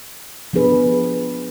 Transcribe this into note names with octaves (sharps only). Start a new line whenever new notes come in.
F3 B3 D4 G#4 B4